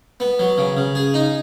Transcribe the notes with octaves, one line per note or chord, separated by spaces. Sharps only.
B3
F#3
C#3
C#3
G#4
D#4